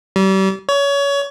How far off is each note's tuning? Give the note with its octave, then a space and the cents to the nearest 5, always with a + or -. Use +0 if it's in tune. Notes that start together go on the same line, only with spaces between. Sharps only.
G3 -35
C#5 +25